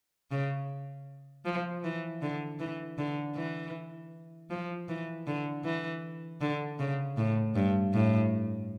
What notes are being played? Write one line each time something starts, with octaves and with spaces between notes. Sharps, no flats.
C#3
F3
E3
D3
E3
D3
E3
F3
E3
D3
E3
D3
C#3
A2
G2
A2